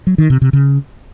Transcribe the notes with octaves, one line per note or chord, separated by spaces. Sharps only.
F#3
D#3
C3
C3
C#3